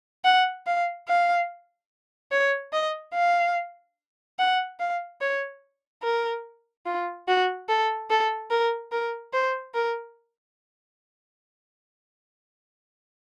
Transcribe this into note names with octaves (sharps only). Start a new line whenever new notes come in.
F#5
F5
F5
C#5
D#5
F5
F#5
F5
C#5
A#4
F4
F#4
A4
A4
A#4
A#4
C5
A#4